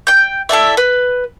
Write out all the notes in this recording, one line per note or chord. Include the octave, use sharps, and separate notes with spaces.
G5 G6
E4 A4 D5 E5
B4